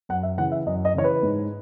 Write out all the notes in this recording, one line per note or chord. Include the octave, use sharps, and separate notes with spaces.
F#2 F#5
E5
C#3 E3 F#5
E5
F#2 D#5
D#5
C#3 E3 C#5
B4
G#2